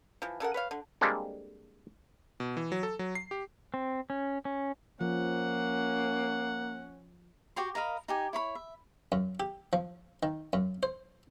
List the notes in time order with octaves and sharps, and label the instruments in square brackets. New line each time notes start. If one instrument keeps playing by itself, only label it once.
[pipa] E3 F3
C#3 A4 A#4 F#5
B4 C#5 F5
D3
[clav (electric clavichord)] G3 G#3 A#3 C4 D4 A4
[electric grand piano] B2
E3
F#3
A4
F#3
C7
G4
[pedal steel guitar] C4
C#4
C#4
[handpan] F3 [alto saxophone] A#3 [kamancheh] C#4 [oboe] F#5
[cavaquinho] F#4 G4 G5 C6
A#4 D#5 F5 B5
D#4 G4 G#5
E4 C#5 B5
E5
[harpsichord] F#2
G4
F3
D#3
F#2
C5